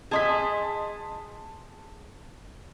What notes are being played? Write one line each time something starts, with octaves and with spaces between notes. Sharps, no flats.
G#4 D#5 A5 C6 B6